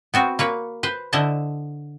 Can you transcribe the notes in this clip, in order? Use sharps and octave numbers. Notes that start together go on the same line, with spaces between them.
B3 C4 F#4
A#3 B4 C#5
B4 C5
D3 E4 C5 D#5 A5